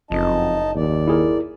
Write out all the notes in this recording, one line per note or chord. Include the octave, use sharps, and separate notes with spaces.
F#1 F2 D#4 D#5 A5
D#2 D5
E4 G#4 A#4